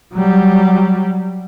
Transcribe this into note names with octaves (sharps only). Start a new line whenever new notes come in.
F#3 G3